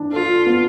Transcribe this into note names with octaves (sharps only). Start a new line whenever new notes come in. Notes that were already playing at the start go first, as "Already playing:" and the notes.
Already playing: E3 D4
F4 A4
B3